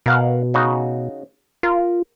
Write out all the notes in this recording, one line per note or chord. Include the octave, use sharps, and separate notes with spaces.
B2 A#4 F5 F#5
C#3 D#4 F#4
F4 A#4